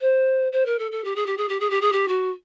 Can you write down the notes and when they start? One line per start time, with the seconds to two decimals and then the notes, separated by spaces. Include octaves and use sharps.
0.01 C5
0.52 C5
0.65 A#4
0.79 A4
0.91 A4
1.04 G4
1.16 G#4
1.26 G4
1.37 G#4
1.49 G4
1.60 G#4
1.70 G4
1.81 G#4
1.92 G4
2.08 F#4